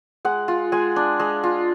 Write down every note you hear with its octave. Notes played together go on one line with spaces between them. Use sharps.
G#3 F#5
F4
G#3 G#5
D4
G#3
F4